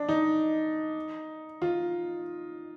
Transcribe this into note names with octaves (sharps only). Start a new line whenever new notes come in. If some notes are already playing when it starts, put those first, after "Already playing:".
Already playing: D4
D#4
F4